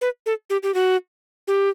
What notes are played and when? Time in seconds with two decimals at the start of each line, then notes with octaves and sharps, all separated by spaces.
0.01 B4
0.26 A4
0.50 G4
0.63 G4
0.74 F#4
1.48 G4